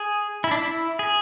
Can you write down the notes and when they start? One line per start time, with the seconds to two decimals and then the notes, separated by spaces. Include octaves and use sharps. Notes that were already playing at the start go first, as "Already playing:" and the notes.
Already playing: G#4
0.44 E4
0.51 D4
0.57 E4
0.99 G#4